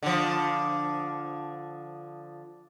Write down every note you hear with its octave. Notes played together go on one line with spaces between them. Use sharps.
D3 F3